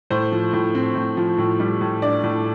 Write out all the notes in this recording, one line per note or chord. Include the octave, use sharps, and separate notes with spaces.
A2 C5
F3
A2
C4
A2
F3
A2
G3
A2
D4 D5
A2